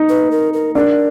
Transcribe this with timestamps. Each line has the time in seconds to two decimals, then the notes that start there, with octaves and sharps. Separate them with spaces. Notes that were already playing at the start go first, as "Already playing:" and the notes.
Already playing: D#4
0.09 B4
0.31 A#4
0.54 A#4
0.75 D4 A#4